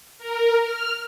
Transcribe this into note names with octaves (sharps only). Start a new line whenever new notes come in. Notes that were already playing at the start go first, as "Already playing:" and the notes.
A#4
F6